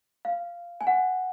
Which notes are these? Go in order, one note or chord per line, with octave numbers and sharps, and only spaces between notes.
F5
G#5
F#5